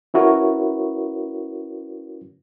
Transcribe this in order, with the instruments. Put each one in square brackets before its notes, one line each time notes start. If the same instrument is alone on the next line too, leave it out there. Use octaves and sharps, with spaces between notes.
[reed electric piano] C#4 E4 F#4 A#4 B4 C#5